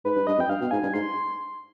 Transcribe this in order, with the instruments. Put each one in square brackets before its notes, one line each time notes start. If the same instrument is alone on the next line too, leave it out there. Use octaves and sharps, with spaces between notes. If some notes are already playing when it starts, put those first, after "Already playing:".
[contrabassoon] G#2 [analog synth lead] B4
[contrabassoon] G2
[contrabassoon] G2 [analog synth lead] D#5
[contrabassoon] F2
[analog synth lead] G5
[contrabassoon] G2 [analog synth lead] F5
[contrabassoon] B2
[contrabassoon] G#2 [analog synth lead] G#5
[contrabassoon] G2
[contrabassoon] G#2 [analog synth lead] C6